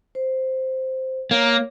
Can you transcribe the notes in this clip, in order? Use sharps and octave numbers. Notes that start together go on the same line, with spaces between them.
C5
A#3 C#5